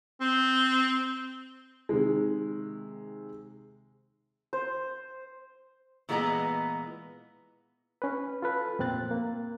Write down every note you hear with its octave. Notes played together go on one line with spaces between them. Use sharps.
C4
C3 D#3 G#3
C5
A#2 E3 G#3 B3 D#5 A#5
C#4 B4
F4 A4 B4
F2 A#2 C4 F#6 A6
A#3